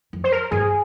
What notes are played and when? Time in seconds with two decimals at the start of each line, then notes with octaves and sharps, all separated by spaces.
0.13 F2
0.24 C5
0.32 A#4
0.51 G2 G#4